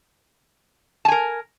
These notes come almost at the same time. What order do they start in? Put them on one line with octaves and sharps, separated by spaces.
A5 G#5 A#4